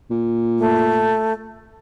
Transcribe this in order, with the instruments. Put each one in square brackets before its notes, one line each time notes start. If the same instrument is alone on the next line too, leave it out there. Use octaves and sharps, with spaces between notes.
[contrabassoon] A#2
[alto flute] A3